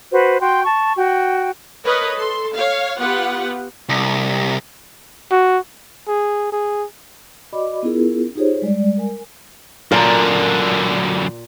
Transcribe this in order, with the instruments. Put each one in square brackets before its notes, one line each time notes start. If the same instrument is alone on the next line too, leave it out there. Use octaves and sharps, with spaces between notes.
[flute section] F#4 B4 C5
F#4 G5 C6
A5 C#6
F#4 G5
[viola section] A#4 B4 C#5 D#5
A4 C6
C#5 F5
B3 F4 G4 B4 F#5
[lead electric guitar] C2
[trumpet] F#4
[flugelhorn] G#4
G#4
[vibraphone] F#4 D5 D#5 B5 D6
B3 C#4 E4 F4 G#4 A#4
D#4 F4 G4 G#4 C5 C#5
G3 G#3 D5
A#4 G#5
[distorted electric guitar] F#2 D3 [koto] A#2 [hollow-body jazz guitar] A#4 F5 A#5